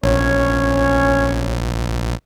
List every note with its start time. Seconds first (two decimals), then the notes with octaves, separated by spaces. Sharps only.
0.03 A#1 C#4 C#5